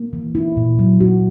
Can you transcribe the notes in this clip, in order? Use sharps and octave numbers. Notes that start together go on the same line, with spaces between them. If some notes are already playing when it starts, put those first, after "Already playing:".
Already playing: A#3
E3
E4
A#2
F#3
F#4